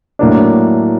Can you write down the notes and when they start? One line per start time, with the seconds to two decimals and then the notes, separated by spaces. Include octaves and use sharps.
0.19 A2 F#3 A#3 D4